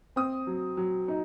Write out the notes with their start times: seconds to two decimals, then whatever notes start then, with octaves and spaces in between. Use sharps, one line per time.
0.16 C4 D#6
0.47 F#3
0.77 F#3
1.08 D#4